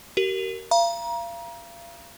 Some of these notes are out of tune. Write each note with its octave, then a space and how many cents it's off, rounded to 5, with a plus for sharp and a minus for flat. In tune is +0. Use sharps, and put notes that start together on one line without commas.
G4 -45 A#4 -5
F5 -35 A#5 +30